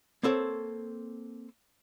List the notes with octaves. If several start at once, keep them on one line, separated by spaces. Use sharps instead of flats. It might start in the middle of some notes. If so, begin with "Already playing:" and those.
A#3 C4 A4 C#5